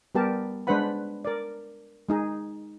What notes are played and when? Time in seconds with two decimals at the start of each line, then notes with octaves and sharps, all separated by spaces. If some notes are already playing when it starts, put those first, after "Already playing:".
0.15 G3 B3 G4 A#4 A5
0.67 G#3 D4 B4 C5 F#5 B5
1.25 A#4 D5
2.09 G#3 D#4 G#4